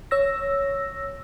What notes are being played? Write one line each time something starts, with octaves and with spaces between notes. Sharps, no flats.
C#5 E6 A#6